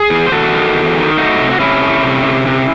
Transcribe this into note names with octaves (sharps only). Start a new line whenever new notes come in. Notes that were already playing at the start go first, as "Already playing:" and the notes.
Already playing: G#4
E2
C5
E2 F#4 A4
D#3
E2
D#3
A3 D#4 F#4
C3
F#4
C3 C#4 E4
A3
C3
C3
C3